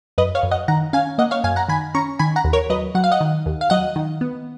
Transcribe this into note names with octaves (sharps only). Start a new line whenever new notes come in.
F#2 B4 D#5
C#5 F5
F#2
D#5 F#5
D#3 F#5 A#5
C#4 F5 G#5
A#3 D#5 F#5
C#5 F5
F#2 F5 G#5
F#5 A#5
D#3 G#5 B5
C#4 A#5 C#6
D#3 G#5 B5
F#5 A#5
D#2
A#4 C#5
F#3 B4 D#5
F#3 F#5
F5
D#5 F#5
D#3
D#2
F5
F#3 D#5 F#5
D#3
B3